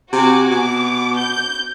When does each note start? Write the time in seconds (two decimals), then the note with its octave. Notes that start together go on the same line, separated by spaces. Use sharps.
0.13 C3 F#4 G#5 D6
0.51 B2 D6
1.16 G6